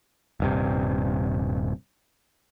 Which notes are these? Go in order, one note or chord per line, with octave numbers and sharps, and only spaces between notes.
D#1 G2 C3